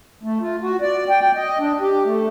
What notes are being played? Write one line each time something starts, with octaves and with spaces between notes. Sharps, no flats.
A3
F4
F#4
D5
G5
G5
D#5
D4
G4
A3